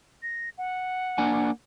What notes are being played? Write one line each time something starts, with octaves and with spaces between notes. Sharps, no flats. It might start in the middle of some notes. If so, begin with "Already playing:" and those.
A#6
F#5
A#3 D4 G#5